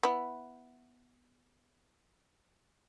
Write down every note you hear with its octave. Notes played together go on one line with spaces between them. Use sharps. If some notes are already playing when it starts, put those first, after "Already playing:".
B3 E4